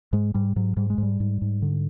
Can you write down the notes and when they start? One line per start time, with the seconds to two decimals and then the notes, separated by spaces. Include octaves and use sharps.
0.13 G#2 G#3
0.34 G#2 G3
0.56 G#2 F#3
0.77 G#2 G3
0.90 G#3
0.98 G#2 G3
1.20 G#2
1.42 G#2
1.62 D3